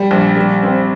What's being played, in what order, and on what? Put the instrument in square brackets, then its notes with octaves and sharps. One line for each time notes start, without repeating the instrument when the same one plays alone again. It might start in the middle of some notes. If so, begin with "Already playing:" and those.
Already playing: [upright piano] G3
A#1
G3
C4